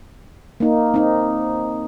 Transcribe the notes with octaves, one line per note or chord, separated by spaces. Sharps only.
A#3 D#4
C4 D#4